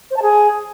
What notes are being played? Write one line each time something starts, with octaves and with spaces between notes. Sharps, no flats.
C5
A5
G#4